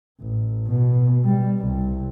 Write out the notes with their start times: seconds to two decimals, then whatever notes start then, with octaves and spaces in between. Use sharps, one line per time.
0.20 A1
0.68 B2
1.25 G3
1.59 C2